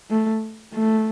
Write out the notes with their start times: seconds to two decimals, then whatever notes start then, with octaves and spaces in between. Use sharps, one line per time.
0.10 A3
0.74 A3